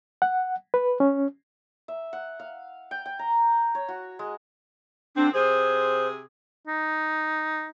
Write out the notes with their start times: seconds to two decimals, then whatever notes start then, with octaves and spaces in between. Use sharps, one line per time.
0.22 F#5
0.74 B4
1.00 C#4
1.88 E5
2.13 F#5
2.40 F5
2.91 G5
3.06 G5
3.19 A#5
3.75 C#5
3.88 F#4
4.19 G#3
5.16 D3 C4 D4
5.33 C3 G#4 C5
6.67 D#4